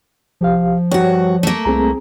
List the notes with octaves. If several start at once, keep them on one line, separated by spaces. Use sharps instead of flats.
C2 F3 G4 F5
G2 F#4 C#5
A3 A#3
C2 C4 G#4 A#5